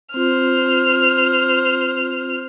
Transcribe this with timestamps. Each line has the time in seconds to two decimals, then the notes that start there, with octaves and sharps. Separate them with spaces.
0.14 C4 F4 C5 F6